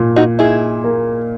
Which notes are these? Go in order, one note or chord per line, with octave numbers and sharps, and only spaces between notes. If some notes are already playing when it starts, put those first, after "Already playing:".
Already playing: A#2
D#4 F#4
D#4 E4 G#4
A#3